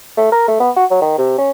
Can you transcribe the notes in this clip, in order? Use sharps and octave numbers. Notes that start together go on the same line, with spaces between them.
A3
A#4
A3
B3
F#4
F#3
D#3
C3
C#4